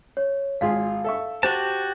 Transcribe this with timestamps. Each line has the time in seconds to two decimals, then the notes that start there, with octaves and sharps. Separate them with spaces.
0.17 C#5
0.61 G#1 F4 G#4 F5
1.04 A4 E5 C#6
1.43 F#4 G4 C5 A5